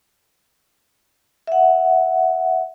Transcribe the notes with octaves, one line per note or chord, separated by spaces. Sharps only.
E5 F#5